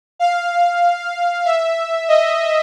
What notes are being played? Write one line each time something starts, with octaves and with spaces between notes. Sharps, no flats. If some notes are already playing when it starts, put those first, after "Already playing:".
F5
E5
D#5